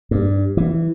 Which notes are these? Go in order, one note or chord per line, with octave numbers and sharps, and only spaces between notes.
G2
E3